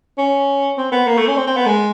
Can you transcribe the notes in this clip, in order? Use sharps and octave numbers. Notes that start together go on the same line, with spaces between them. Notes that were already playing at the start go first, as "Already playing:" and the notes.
C#4
C4
B3
A#3
A3
C#4
C4
C4
B3
G#3